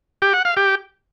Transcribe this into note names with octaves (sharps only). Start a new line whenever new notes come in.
G4
F#5
F5
G4